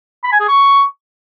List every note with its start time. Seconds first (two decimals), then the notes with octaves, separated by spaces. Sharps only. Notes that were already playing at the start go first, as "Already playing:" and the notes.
0.24 B5
0.32 G#5
0.40 G#4
0.48 C#6